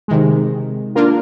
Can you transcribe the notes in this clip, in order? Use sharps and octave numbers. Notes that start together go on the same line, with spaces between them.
C3 D#3 G#3
A#3 D4 F4 A#4